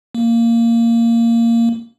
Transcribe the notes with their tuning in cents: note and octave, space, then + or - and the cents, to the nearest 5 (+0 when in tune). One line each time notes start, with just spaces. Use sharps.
A#3 -10